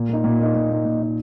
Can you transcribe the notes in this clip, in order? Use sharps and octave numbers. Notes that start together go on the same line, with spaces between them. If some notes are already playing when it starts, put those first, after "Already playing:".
Already playing: A#2
A#3 D#4
A#2
A#3 D#4
A#2
A#3 D#4
A#2
A#3 D#4